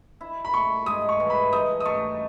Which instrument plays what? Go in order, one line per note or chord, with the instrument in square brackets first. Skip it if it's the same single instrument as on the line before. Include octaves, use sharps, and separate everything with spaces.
[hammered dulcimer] E4
[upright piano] B5
[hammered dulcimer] A3 [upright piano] C#6
[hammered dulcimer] G#3 [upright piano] D#6
[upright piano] C#6
[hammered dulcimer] E3
[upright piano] B5
[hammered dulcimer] D#4 [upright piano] D#6
[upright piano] D#6
[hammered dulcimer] A3 [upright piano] C#6